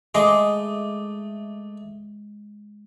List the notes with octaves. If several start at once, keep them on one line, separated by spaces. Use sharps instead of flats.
G#3 A3 D#5 D6